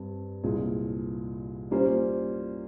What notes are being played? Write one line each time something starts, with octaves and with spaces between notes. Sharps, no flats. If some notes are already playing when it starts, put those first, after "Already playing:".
Already playing: G2 C4
C2 A#2 G#3
G3 A#3 C#4 F4 C5